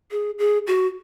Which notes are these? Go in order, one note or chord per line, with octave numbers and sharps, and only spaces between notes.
G#4
G#4
F#4